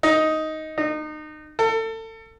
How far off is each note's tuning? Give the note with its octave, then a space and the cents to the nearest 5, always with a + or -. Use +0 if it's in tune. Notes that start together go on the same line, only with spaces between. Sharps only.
D#4 +5
D#4 -30
A4 +30